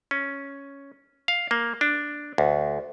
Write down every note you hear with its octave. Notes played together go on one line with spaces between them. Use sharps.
C#4
F5
A#3
D4
D2